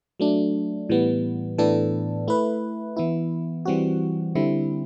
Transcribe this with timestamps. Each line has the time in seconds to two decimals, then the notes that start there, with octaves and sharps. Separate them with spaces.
0.20 F#3 A3 D4
0.89 A2 E3 G3 B3
1.58 A2 E3 B3 D4 A4
2.28 A3 E4 B4
2.97 E3 B3 E4
3.65 E3 G3 C4 F#4
4.35 D3 G3 C4 E4